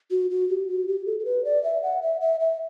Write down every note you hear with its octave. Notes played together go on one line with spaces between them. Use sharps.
F#4
F#4
G4
F#4
G4
A4
A4
B4
D5
E5
F#5
E5
E5
E5